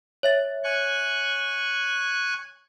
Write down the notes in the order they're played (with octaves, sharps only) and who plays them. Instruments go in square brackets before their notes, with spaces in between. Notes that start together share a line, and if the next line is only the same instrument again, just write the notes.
[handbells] C#5 E5 A6
[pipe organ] G#5 C#6 F#6